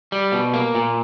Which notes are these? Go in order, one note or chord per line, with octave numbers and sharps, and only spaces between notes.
G3
B2
A#3
A#2